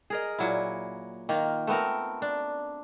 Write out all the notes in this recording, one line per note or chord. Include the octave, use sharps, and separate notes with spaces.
G#4 A#4 D#5
A#2 F#3 E4
D#3 A#3 F4
A3 B3 C4 A#4
D4